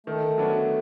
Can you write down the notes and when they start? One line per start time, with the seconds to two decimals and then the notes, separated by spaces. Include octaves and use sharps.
0.06 D#3 A3
0.38 F#3 B3 D4